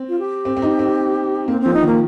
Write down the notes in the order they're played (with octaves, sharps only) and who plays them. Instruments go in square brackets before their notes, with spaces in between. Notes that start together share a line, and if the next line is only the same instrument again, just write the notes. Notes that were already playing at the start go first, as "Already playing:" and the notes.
Already playing: [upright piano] C4
[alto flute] F4
G4
[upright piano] C4
C4
D#4
C4
[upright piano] A#3 [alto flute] C4
[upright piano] F3 [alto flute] C4
[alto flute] D#4
[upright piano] D#3
[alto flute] A#3